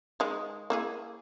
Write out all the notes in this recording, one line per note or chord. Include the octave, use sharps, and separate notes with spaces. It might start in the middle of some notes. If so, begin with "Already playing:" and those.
D#3 G#3
A#3 E4 G#4